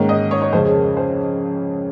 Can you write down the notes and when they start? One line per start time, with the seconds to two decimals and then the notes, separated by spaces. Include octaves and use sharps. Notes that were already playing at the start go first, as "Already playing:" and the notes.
Already playing: G#2 D#3 A#3 C#4
0.09 D#5
0.31 C#5
0.42 C#5
0.53 F2 C#3 G#3 C#4 C5
0.65 G#4
0.75 A#4
0.97 C5